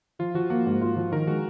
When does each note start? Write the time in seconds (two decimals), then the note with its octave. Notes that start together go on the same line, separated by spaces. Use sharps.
0.19 F3 F4
0.34 F3 F#4
0.50 A#3 F#4
0.66 G#2
0.81 F4
0.96 F3
1.12 D#3 A#4
1.27 G#3 F#4